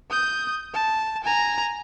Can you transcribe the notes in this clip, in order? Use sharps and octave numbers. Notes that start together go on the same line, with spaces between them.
D#6 G6
A5
G#5 A#5